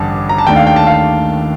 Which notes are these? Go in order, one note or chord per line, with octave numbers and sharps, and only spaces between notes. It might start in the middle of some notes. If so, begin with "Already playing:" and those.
Already playing: A1 G2 D3 A5
A#5
A5
D#2 D#3 A3 D4 G5
F5
G5
A5
F5